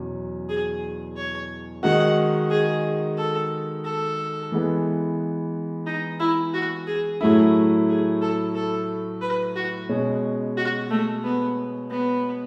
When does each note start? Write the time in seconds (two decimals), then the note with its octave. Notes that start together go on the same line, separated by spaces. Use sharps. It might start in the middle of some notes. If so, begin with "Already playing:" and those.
Already playing: E2 B2 F#3 C#4
0.49 G#4
1.17 C#5
1.83 D#3 G#3 D#4 F#4 F#5
2.50 G#4
3.17 A4
3.84 A4
4.52 E3 G#3 B3
5.86 D#4
6.20 E4
6.54 F#4
6.87 G#4
7.21 A2 F#3 A3 E4 G#4
7.88 G#4
8.21 A4
8.55 A4
9.22 B4
9.55 F#4
9.89 B2 G#3 C#4
10.57 F#4
10.90 A3
11.24 B3
11.90 B3